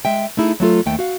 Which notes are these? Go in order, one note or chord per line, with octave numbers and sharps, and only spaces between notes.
G#3 E5 G5
A3 D#4 E4 G#4
F#3 A3 F4 A4
D#2 A3 G5
F#4 F5